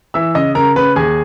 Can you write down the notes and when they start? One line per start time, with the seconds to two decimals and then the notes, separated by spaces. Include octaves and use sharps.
0.14 E3 E5 E6
0.35 C#3 D#5 D#6
0.55 C#3 A#4 A#5
0.76 C#3 B4 B5
0.96 D#2 G#4 G#5